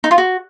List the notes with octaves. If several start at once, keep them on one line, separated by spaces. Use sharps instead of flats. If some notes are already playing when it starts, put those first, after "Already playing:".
D#4
F4
F#4